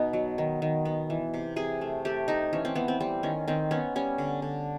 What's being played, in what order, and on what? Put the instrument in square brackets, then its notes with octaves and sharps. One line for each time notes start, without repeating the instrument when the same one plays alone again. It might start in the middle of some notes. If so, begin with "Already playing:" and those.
Already playing: [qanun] B2 B3 D#4
F#3
D#3
D#3
B3
E3
C3
C3 G#4
A3
A3 G4
A3 D#4
E3 C#4
C4
E3 B3
C4
G3 C4
D#3 C#4
D#3 C4
B3 C#4
G3 C#4
D3
D3